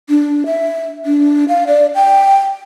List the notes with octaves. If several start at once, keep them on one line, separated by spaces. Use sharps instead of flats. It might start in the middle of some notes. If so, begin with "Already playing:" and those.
D4
E5
D4
F5
D5
G5